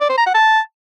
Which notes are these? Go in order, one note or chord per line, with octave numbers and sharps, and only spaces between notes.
D5
C5
A#5
F#5
A5